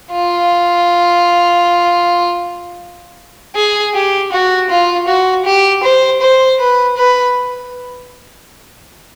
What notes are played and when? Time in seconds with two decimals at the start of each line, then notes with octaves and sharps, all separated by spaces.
0.13 F4
3.56 G#4
3.94 G4
4.32 F#4
4.69 F4
5.07 F#4
5.45 G4
5.83 C5
6.21 C5
6.59 B4
6.97 B4